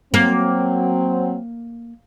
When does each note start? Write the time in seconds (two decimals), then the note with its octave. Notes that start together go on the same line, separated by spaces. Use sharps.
0.14 F#3 A#3 C4